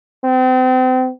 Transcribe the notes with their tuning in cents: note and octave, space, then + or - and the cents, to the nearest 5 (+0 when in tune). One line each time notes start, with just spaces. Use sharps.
C4 -35